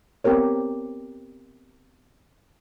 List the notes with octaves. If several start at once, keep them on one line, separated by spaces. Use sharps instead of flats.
B3 C4 G4 A#4 C#5